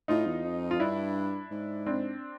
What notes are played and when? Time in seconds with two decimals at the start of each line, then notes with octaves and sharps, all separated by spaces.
0.08 A2 D#4 F4
0.26 E2
0.45 F2
0.71 F4
0.80 G2 D4 E4
1.51 G#2
1.86 C4 D4